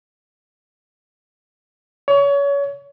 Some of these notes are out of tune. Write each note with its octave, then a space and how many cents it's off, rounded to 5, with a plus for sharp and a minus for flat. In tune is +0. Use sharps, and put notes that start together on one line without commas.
C#5 +30